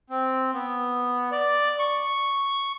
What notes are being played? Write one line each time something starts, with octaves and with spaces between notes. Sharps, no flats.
C4
B3
D5
C#6